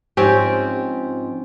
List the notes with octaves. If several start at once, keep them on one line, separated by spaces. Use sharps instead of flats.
G#2 F3 C4 C#4 G4